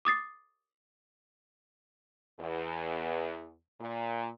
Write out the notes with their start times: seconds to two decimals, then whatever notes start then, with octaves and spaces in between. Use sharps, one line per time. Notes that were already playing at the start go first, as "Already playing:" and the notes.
0.05 D6 D#6 A6 C7
2.38 E2
3.80 A#2